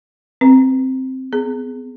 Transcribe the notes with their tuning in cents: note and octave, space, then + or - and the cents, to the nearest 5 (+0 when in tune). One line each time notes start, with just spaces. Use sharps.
C4 +0 B4 +0
B3 +30 G#4 +10